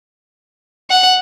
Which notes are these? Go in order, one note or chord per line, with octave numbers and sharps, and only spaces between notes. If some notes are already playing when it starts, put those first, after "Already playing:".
F#5